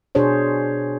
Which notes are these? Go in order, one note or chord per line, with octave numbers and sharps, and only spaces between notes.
B2 D4 G#4 C5 C#5